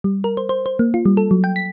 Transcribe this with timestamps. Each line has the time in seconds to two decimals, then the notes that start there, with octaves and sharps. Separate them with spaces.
0.04 G3
0.24 A#4
0.37 C5
0.49 C5
0.66 C5
0.79 A#3
0.94 F4
1.05 G3
1.17 A4
1.31 F#3
1.44 G5
1.56 B6